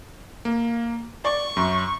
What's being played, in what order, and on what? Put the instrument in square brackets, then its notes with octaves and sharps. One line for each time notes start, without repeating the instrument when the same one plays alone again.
[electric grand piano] A#3
[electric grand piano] D5 [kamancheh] C#6
[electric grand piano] F#2